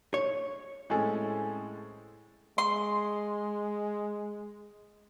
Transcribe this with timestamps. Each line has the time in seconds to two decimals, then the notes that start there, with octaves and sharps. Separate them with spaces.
0.14 C#5
0.90 A2 G#3 C4 C#4 G#4 A4
2.58 G#3 C6